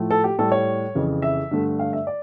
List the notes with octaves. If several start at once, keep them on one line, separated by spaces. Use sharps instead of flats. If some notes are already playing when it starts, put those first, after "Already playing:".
Already playing: A2 F3 A3
A4
G4
A2 G3 A4
C#5
F2 C#3 E3
E5
G2 D3 A3
F5
E5
D5